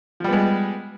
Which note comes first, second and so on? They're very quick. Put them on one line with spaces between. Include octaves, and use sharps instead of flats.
F3 G3 B3 G#3